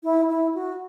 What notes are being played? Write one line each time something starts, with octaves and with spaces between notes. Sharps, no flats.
E4
E4
F#4